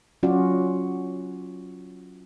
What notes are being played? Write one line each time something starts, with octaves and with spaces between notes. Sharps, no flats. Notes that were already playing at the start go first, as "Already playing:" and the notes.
F#3 C#4 F4 F#4 D5